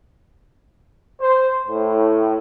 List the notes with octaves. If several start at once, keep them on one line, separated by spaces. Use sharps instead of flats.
C5
A2